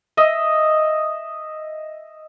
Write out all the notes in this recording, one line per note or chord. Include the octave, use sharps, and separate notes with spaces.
D#5 E5